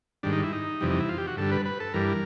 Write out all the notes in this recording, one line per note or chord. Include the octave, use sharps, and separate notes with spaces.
G#2 D#3 G3 D4
D#4
E4
D#4
F2 C3 E3 G3
D#4
E4
F4
G4
F#4
G2 D3 G3 A4
B4
B4
A4
G2 E3 G3 A#4